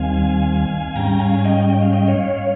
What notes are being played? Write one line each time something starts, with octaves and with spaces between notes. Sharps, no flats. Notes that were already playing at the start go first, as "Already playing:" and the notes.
Already playing: D#2 D#3 G3 C4 F5 G#5
G#2 G3 C#4 G5 A#5
F5 G#5
G#5
D#5 G5
G5
F5
D#5 G5
C#5 F5